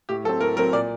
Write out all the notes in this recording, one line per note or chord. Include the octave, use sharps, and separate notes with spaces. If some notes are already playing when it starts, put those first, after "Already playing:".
A2 G4
F#3 A4
C4
A2 A#4
F#3 C4 A#4
A#2 D5